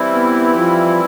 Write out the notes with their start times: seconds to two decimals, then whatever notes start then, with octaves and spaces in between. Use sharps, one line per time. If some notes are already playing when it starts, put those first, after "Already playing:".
Already playing: E3 G3 C4 E4
0.14 B3
0.56 F3